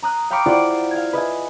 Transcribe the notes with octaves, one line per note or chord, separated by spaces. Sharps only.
A#5 D#6 F#6
F5 G5 A#5 B5 C#6 D6
E4 F4 G4 C5 D5 F#5
F5 G#6
B4 D#5 E5 G#5